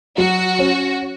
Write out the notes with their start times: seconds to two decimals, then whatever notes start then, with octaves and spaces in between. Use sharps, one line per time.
0.17 F#3 F#4
0.59 C#4